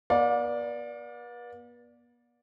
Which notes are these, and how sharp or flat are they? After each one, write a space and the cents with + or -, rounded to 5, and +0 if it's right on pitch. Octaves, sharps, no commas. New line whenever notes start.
B3 -40 D5 -5 F5 +45